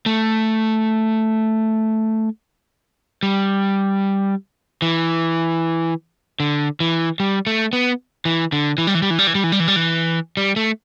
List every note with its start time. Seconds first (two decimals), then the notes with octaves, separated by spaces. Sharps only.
0.06 A3
3.23 G3
4.82 E3
6.40 D3
6.80 E3
7.20 G3
7.47 A3
7.73 B3
8.25 E3
8.52 D3
8.78 E3
8.87 G3
8.95 E3
9.02 G3
9.10 E3
9.19 G3
9.27 E3
9.35 G3
9.44 E3
9.52 G3
9.60 E3
9.68 G3
9.76 E3
10.37 G3
10.56 A3